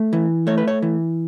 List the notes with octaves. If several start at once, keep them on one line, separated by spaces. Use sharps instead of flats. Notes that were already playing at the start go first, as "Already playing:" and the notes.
Already playing: A3
E3
A3 C#5
B4
C#5
E3